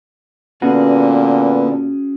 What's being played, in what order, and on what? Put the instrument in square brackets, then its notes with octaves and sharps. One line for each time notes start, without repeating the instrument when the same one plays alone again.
[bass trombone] A#2 [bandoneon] D3 [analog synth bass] B3 [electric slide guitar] C#4 F#4 G#4